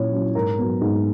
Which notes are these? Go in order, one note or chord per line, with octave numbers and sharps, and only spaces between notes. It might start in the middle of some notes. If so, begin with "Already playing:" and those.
Already playing: A#2 F#3 C#4 E4 C#5
F#3 C#4 E4
G#2 A#4
F#3 B3
G#2